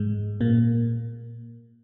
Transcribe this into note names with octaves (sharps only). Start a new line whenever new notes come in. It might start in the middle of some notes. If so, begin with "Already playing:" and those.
Already playing: G#2 G#3
A#2 A#3